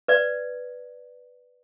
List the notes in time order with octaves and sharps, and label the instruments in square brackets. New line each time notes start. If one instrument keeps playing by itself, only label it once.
[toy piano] B4 D5